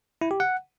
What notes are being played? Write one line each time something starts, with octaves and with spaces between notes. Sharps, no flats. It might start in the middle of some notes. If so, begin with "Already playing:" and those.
E4
G4
F#5